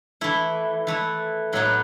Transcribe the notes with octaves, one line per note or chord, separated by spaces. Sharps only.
E3 A3 E4
E3 A3 E4
A2 F#3 B3 D#4 F#4